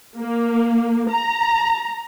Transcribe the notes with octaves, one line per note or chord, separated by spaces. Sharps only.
A#3
A#5